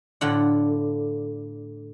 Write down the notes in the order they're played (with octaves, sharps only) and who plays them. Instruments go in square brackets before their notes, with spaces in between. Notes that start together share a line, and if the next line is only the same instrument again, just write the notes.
[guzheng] A2 D3 F4 F#5